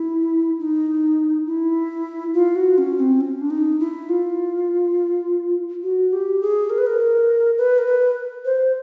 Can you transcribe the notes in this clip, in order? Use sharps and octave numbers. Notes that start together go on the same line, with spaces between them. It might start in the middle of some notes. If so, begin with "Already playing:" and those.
Already playing: E4
D#4
E4
F4
F#4
C#4
C4
C#4
D4
D#4
E4
F4
F#4
G4
G#4
A#4
B4
A#4
B4
A#4
B4
C5